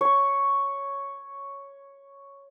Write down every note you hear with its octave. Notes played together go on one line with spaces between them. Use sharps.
C#5 C#6